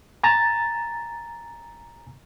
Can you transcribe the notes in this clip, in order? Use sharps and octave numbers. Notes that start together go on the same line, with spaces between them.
G#5 A#5 A6